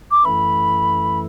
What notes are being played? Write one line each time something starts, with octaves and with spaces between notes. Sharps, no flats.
D6
F#2 E3 A3 E4 A4 B5